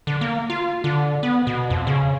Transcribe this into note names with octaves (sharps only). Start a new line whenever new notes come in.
D3
A#3
F4
D3
B3
B2
F2
C#3